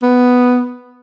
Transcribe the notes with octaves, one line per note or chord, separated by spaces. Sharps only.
B3